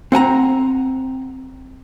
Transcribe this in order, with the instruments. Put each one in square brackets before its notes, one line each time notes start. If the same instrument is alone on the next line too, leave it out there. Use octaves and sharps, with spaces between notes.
[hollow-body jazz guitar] C4 F#5 G#5 A#5